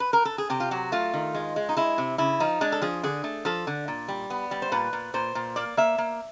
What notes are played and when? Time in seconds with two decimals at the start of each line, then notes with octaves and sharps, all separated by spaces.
0.00 B4
0.13 A#4
0.25 A4
0.38 G#4
0.50 C3 G4
0.60 F4
0.71 F#3 F#4
0.92 A3 F4
1.13 D#3
1.34 G#3
1.56 G#3
1.69 D#4
1.76 G#3 E4
1.98 C3
2.18 C#3 E4
2.40 F3 D#4
2.61 G#3 D4
2.72 A4
2.82 F3 G#4
3.03 D3 G#4
3.24 A3
3.45 F3 A4
3.67 D3
3.88 A#2
4.08 G3
4.30 B3
4.51 G3
4.62 C5
4.72 A#2 B4
4.93 A#2
5.14 A#2 C5
5.35 A#2
5.56 A#3 D5
5.77 A#3 E5
5.98 A#3